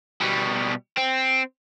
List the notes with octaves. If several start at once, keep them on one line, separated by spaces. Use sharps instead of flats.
B2 G3
C4